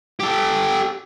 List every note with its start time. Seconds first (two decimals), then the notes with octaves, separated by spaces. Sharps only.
0.20 G4 A4